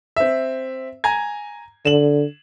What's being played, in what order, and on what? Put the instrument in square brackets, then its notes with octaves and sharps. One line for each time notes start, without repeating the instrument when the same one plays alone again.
[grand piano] C4 E5
G#5 A#5 G#6
[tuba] D3 [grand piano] E7 F#7